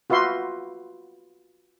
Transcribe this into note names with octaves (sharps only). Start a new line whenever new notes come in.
F4 F#4 B4 E5 C6